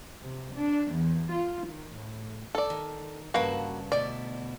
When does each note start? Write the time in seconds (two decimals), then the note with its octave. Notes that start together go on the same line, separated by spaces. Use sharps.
0.23 C3
0.54 D4
0.93 E2
1.32 F4
1.65 D#3
1.95 A2
2.55 A4 D5
2.70 D#3
3.34 G2 C#3 A#3 F#4 B4 A5
3.92 D2 B2 E4 D5